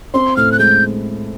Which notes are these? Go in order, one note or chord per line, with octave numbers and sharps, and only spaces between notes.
C4 C6
A2 F6
F#6
G#3 G6